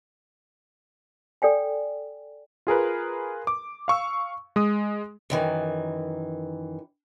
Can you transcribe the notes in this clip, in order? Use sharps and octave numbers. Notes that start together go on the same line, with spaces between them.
A4 D5 G5 G#5
F4 G#4 A#4 B4
D6
F5 C#6 E6
G#3 D#6
F#2 D#3 E3